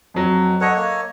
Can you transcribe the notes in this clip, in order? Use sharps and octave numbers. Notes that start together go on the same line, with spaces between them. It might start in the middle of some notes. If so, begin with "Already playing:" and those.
F2 F#3
A4 C#5 D#5 F#5
A#3 C#5